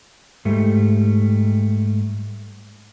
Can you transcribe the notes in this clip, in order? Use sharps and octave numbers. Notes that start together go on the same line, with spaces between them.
G#2 G3 A3